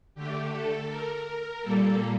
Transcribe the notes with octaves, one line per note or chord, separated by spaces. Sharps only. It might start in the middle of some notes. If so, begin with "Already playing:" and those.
D3 A3 G4
A4
A#4
A#4
A#2 G3 A#3 A4